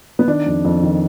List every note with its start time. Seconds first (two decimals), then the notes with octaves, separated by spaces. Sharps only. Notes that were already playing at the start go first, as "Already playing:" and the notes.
0.19 B3
0.27 D#3 D4
0.46 F2
0.65 F2
0.83 D#3